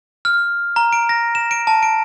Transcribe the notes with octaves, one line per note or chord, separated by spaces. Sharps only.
F6
A#5
D7
A#6
E7
D7
A5
D7